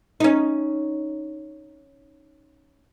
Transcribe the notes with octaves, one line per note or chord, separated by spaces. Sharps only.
C#4 D#4